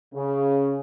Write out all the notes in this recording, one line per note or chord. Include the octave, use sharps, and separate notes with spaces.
C#3